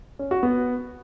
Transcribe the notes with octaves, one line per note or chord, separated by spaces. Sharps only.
C#4
F#4
B3